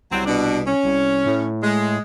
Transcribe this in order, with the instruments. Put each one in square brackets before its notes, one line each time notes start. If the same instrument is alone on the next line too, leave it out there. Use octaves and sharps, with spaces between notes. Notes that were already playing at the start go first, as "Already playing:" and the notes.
[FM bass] C2 [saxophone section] F#3 C4
[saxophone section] B2 D4
C#4
[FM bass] C2
A2
[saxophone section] G#3